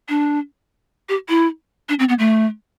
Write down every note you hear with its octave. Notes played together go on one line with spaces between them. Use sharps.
D4
G4
E4
D4
C4
B3
A3